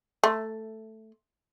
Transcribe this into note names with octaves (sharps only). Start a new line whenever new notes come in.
A3